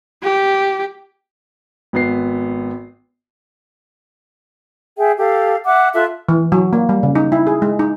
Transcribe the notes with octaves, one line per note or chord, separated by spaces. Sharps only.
G4
G#1 B3 C7
G#4 E5 G5
G4 A4 F5
E5 F#5 D6
F4 A4 E5 F#6
E3
F#3
A#3
G3
C#3
D#4
E4
G#4
G#3
D#4